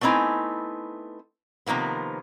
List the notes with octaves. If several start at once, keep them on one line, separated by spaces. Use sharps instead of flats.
A3 B3 C4 D#4 E4 G#5
C3 D#3 F3 A#3 B3